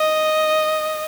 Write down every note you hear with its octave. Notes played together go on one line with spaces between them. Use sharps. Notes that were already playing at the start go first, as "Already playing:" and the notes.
Already playing: D#5